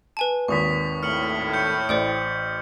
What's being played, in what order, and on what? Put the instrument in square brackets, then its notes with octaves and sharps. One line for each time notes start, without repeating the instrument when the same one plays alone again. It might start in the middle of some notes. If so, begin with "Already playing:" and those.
[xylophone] B4 G#5 A5
[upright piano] G#1 D#2 [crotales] C#6 D#6 B6
[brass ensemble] A2 [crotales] F6 C#7 F#7
[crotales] G6 C#7
[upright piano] A1 [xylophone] C5 D5 G5